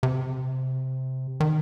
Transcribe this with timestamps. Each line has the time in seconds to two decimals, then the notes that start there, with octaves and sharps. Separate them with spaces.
0.03 C3
1.40 D#3